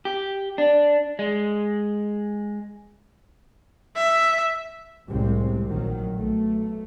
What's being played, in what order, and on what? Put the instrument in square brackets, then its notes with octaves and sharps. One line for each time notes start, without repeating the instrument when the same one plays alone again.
[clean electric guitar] G4
D4
G#3
[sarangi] E5
[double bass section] C2 A2 C3 G#3 C4
A#1 D#3 F#3
B1 A3